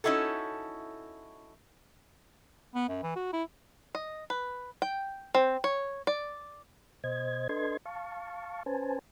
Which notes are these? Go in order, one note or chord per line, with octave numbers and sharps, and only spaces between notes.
C#4 D#4 E4 F#4 A4
B3
F#2
E3
F#4
E4
D#5
B4
G5
C4
C#5
D5
B2 C5 D#5 G#6
D4 A4 B4 D#5 C6 G#6
F5 A5 C#6
C#4 B4 C5 G#5 A5